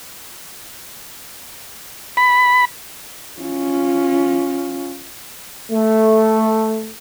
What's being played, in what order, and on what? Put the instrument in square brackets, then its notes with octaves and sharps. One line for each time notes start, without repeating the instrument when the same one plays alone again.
[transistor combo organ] B5
[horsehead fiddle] C#4 F4
[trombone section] A3